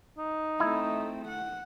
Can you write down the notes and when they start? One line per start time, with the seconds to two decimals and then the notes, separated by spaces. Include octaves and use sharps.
0.18 D#4
0.60 A3 C4 E4
1.28 F#5